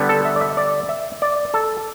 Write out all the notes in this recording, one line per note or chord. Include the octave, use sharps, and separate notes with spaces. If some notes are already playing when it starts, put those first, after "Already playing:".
Already playing: D3 G3 B3
A4
E5
D5
E5
D5
E5
D5
A4